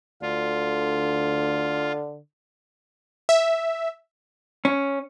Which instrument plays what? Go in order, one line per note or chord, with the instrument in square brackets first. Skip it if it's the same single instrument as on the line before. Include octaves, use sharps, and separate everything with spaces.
[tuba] D2 [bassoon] D3 [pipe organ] F4
[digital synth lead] E5
[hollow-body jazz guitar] C#4